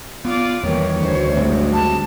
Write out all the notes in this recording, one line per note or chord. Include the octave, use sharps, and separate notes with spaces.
B3 F4 D5
E2 D#3 E3 G3 A#3 C#5
D2 E3 C5
F#1 G#2 G3 G#3 C4
A5